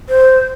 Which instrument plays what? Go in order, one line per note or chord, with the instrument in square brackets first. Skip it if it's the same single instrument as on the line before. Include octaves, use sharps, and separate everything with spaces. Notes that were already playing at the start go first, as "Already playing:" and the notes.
[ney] C5